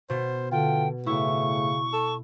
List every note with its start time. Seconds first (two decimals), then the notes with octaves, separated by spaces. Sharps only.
0.10 B2 C5
0.51 D3 F4 G5
1.06 A2 C#3 E4 C#6
1.93 A4